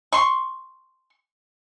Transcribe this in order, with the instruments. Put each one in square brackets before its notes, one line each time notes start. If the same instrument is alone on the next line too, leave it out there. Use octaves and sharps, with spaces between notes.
[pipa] C6 C#6